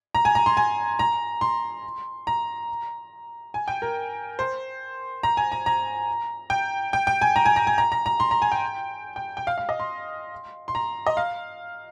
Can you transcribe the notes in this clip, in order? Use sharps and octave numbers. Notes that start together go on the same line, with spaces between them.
A#5
G#5
A#5
C6
G#5
A#5
C6
A#5
G#5
G5
A#4
C5
A#5
G#5
A#5
A#5
G5
G5
G5
G#5
A#5
G#5
A#5
G#5
A#5
A#5
A#5
C6
A#5
G#5
G5
G5
G5
F5
F5
D#5
C6
C6
A#5
D#5
F5